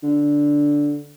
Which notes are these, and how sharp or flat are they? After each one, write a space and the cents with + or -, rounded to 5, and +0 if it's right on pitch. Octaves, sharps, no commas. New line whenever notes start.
D3 -5